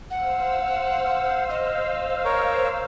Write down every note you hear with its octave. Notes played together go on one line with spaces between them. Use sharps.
C5 F5 F#5 E6
D#5
A#4 C#5